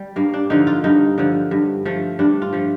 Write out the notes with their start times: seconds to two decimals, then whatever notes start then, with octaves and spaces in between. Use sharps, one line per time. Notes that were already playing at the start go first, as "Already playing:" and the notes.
Already playing: G3
0.16 G2 A#3
0.34 D4
0.50 D3 F3 D#4
0.67 F4
0.84 G2 D#4
1.18 D3 F3
1.51 G2
1.85 F3 A3
2.19 G2 D4
2.42 F4
2.53 F3 A3